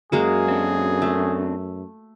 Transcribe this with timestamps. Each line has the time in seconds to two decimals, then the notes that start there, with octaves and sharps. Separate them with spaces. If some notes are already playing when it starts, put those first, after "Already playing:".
0.12 F#2 G#3 A#3 F#4 G#4
0.48 C4 D4 A4
1.02 A3